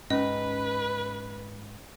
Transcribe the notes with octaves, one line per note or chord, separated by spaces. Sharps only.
G#2 C#4 B4 D#5